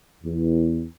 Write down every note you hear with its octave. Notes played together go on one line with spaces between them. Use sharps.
E2